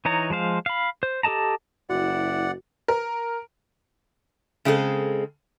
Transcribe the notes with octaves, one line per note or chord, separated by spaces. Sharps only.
E3 D#4 C#5 A#5
F3 G#3 C5 F5
F5 B5
C5
G4 A4 D#5 A5 A#5
F#1 E4 F#4 D5 F#5
A#4
C#3 G#3 C4 D#4 A4